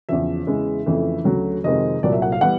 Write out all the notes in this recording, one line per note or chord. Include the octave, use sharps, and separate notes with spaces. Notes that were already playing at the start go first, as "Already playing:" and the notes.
E2 C#3 F3 E5
E2 C#3 E3 G#3
F2 C#3 E3 A3
D2 C#3 F#3 A3
F2 C3 D#3 G#3 C4 D#5
C2 A#2 F#3 D5
E5
F#5
F5
E3 G3 B3 F#5